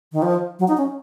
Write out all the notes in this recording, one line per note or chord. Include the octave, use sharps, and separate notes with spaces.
D#3
F3
F#3
D#4
C#4